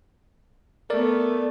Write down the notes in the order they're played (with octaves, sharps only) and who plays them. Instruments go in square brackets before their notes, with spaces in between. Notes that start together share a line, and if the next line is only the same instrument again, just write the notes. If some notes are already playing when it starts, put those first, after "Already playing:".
[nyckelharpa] A3 B3 [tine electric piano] A#4 D5